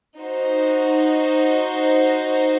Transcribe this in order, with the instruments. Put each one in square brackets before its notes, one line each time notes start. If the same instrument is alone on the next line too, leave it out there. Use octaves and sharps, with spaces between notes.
[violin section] D#4 F#4 C5